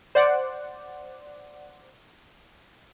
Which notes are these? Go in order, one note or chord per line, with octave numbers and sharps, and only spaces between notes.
C5 D5 F#5